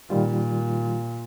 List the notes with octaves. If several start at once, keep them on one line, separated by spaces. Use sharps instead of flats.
A#2 D#3 G3 F4